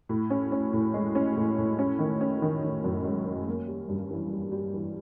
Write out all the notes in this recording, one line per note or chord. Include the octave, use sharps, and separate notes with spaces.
A2
C#4
C#4
A2
G#3
C#4
A2
A2
C#4
D#3
C#4
D#3
D#3
F#2
G#3
C#4
A#3
G3
G2
E3
G3
G3
E3